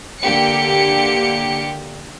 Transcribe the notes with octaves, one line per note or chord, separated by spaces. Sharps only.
D3 A#3 G4 C#7